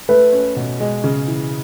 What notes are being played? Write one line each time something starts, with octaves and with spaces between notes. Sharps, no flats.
A3 B4
C#4
B2
G#3
C#3
E3